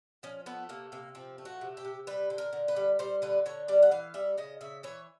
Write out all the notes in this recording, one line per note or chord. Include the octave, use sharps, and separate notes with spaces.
F3 C#4
A3 B3
C3 A#3
C3 A#3
F3 C4
A3
F#4
C3
G4
C3
G3 B4
D3
A#4
D3
B4
G3
G3 C5
D3 B4
D3 C#5
G3 D5
F#5
E3 F5
G3 E5
C#3 D#5
C#3 E5
E3 C#5